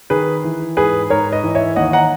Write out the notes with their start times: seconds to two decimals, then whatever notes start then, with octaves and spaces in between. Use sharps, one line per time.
0.10 D#3 G#4 B4
0.44 E3
0.77 G#2 G#4 B4
1.10 G#2 A#4 C#5
1.32 B4 D#5
1.44 E3
1.55 C#5 E5
1.76 D#2 D#5 F#5
1.93 F#5 A#5